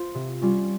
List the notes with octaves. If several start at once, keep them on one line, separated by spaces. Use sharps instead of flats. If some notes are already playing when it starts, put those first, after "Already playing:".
Already playing: F4 C5
C3
G3 C#4 F4